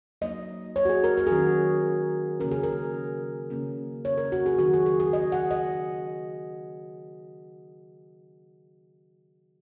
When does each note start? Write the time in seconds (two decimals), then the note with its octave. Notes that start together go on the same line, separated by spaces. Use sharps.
0.21 F#3 A#3 D#4 D#5
0.76 C#5
0.85 F#4
0.89 G#4
1.04 A#4
1.18 A#4
1.27 G#4
1.31 D#3 F#3 C#4 F#4
2.40 C#3 A#3 C#4 A#4
2.52 G#4
2.63 A#4
3.50 C#3 A#3 C#4
4.05 C#5
4.18 A#4
4.32 F#4
4.46 G#4
4.59 D#3 F#3 D#4 F#4
4.73 G#4
4.86 G#4
5.00 G#4
5.13 D#5
5.32 F#5
5.51 D#5